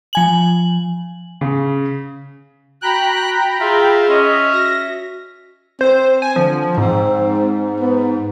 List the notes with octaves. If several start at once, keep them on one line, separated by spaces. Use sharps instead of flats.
F3 G#5 F#7
C#3
F#4 G5 A#5 B5 F#6
F4 G#4 E5
C#4 D#5
F#4 A#6
C4 C5
G#5
D3 F3
G#2 C4
B3